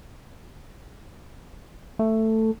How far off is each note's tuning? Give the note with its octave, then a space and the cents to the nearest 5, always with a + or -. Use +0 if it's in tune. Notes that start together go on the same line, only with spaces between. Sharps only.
A3 +10